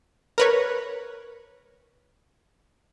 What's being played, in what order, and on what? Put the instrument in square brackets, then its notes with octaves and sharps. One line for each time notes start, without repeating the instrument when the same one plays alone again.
[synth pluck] A#4 B4 C#5